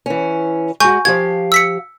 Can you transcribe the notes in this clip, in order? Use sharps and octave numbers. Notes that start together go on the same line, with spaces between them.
E3 C#4
G#3 F#4 G#5 C#6 G6
F3 G4 F5 G#6
E6 B6 C#7